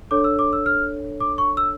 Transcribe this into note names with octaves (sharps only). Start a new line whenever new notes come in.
D4 A4 C#5 D6
E6
D6
E6
F6
D6
C#6
E6